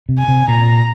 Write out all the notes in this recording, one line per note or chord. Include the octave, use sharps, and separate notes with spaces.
C3
G#5
C3
A#2 A#5